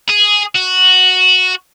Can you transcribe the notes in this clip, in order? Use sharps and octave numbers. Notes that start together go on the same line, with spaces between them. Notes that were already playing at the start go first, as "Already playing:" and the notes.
G#4
F#4